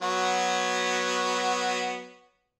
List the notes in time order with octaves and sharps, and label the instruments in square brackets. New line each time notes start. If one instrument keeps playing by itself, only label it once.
[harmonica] F#3 B3 F#4